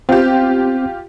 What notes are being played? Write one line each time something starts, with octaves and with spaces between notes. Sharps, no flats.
C4 F4 G4